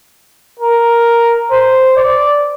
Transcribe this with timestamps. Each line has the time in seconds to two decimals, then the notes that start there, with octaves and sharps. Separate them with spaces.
0.59 A#4
1.51 C5
1.97 D5